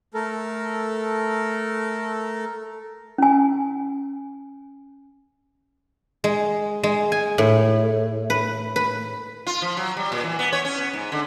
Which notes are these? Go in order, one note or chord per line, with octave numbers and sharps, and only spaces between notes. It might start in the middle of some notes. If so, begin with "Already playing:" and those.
A3 A4 A#4
C#4 G#5
G#3
G#3
G#5
A2
B4
B4
F4
F3
F#3
G3
A#2
E3
B3
C#5
C#4
B3
G#2
D3